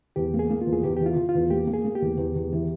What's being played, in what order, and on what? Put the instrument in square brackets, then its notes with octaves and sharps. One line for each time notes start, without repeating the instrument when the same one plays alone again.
[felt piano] E2 [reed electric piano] G4
[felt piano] A#3
[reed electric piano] G#4
[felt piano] A#3
[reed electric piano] F4
[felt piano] E2
[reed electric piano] G#4
[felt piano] E2 [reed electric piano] G4
[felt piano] E3 [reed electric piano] G4
[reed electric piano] F4
[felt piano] E3
[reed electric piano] F4
[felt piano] E2
[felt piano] A#3 [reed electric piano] G4
[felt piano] A#3
[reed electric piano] G#4
[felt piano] A#3
[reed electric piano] G4
[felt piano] E2
E2
E2
E3